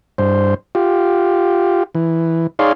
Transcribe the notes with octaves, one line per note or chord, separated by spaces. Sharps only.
G2 C5
F4 G4
E3
D#4 G#4 C#5 D5 F5 C6